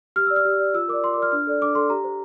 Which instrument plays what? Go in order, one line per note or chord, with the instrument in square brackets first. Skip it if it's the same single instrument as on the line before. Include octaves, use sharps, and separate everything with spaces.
[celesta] G4 F6
E6
D5
F6
G4
D5
F4 E6
A#4 D5 D6
F4 C6
D6
A#4 D5 F6
D4 F6
A4 D5
D4 D6
A4 D5 C6
G4 A#5
C5